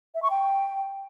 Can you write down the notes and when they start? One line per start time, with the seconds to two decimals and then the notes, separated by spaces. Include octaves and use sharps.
0.15 E5
0.23 C#6
0.30 G5